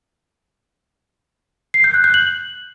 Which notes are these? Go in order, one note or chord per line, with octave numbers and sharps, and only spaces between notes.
C7
G6
F#6
G6
F#7